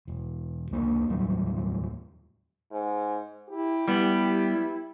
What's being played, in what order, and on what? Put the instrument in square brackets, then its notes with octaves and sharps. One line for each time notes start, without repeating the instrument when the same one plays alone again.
[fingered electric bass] E1
C#2 A#3 D4
D#2 A2 F#3 G3
[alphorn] G#2
[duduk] E4 [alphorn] G4
[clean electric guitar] G3 B3 [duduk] E4